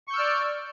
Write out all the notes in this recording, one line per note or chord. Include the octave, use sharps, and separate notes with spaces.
D5 C#6 E6 F6 G6